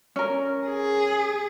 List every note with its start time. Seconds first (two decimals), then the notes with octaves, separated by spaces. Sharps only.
0.16 C#4 A#4
0.67 G#4